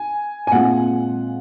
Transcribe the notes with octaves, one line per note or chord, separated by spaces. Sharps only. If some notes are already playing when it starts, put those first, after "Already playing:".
Already playing: G#5
G#5
A#2 G#3 C4 F4 F#5